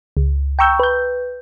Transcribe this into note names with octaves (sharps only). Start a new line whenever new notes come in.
C#2
G5 A#5 C#6 E6 G6
B4 G6